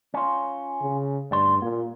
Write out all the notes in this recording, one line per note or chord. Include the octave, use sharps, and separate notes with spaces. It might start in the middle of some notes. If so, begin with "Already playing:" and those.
C#4 F4
C#3
D2 G2 D5 C6
A#2 A#3